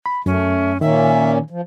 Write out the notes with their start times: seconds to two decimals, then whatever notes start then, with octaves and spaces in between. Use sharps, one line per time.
0.06 B5
0.26 F#2 A3 C#4
0.81 A#2 D#3 A#3 C#4 E5
1.50 F3